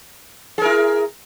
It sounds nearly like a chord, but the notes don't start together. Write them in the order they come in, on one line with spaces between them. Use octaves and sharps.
G#4 A#4 E4